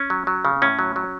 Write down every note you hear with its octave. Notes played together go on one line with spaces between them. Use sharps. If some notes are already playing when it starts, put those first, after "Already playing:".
Already playing: C#4
F#3
F#3
C#3
A2 C#4
F#3
F#3